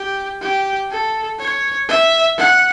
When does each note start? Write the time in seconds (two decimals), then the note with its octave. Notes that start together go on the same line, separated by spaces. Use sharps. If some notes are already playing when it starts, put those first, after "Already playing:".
Already playing: G4
0.41 G4
0.90 A4
1.39 C#5
1.89 E5
2.38 F#5